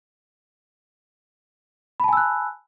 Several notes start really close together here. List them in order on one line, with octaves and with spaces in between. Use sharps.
B5 A5 G#5 E6 F#6